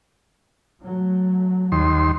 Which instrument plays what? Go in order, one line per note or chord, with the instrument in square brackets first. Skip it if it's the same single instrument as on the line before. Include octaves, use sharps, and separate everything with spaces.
[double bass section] F#3 A3
[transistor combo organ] D#2 C6 [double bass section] G3